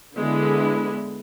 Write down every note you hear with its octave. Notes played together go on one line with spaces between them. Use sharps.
D3 G#3 B3 E4